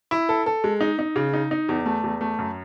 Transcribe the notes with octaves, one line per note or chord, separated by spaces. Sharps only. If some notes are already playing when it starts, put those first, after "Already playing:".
E4
A4
A4
G#3
D#4
D#4
C#3
D#4
D#4
E2
A3
E2
A3
F#2